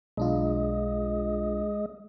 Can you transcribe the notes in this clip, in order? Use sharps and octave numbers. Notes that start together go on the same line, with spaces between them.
B1 G#3 D4 F4 D#5